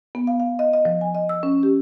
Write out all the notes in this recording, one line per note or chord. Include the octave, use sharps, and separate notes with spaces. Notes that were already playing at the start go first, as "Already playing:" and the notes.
B3
F5
F5
D#5
D#5
F3
G#5
D#5
E6
C#4
G4